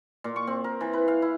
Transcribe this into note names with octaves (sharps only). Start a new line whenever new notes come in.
A#2
C#6
C4
A#4
E3
B4
F5
E4